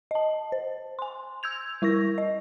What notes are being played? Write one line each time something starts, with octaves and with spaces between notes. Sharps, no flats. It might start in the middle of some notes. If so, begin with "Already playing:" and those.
D#5 A5
C5
G#5 C6
E6 G6 G#6 F7
G3 E4 A#4 C#6 A#6
D#5